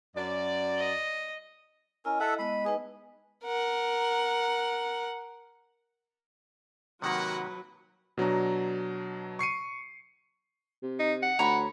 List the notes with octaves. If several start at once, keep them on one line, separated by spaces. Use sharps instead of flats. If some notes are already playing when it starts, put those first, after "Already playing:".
F#2 D5
D#5
C#4 E4 A#4 D#5
A4 E5 F#5
G#3 B3 D#5 B5
D#4 G#4 B4 D#5
A#4 F#5
C3 D#3 F#3 A#3 F#4 A#4 B4 F#5
B2 F#3 D4 A#5
C#6 C7 C#7 D#7
C3
D#4
F#5
D2 C#5 A#5 B5